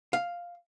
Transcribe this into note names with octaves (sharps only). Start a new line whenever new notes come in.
F5